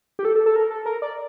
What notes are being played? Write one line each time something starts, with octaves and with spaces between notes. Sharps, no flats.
G4
A4
A4
A4
A#4
A4
A#4
D5